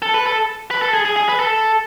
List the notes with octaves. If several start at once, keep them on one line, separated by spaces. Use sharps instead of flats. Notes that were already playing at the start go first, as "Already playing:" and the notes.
A4
B4
A4
B4
A4
G#4
G#4
G#4
B4
A4